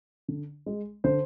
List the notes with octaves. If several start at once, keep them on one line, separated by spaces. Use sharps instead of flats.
D3
G#3
D3 C5